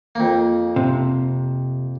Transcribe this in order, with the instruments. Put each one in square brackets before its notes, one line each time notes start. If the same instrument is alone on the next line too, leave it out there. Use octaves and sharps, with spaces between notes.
[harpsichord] F2 A#3
[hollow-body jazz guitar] C3